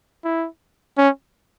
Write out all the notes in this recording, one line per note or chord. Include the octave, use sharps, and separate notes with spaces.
E4
C#4